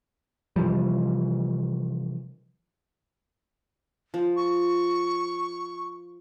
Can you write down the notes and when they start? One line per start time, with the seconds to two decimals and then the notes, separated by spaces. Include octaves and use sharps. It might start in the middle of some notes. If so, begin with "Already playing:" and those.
0.56 C3 E3 F3 G3
4.14 F3
4.36 C#6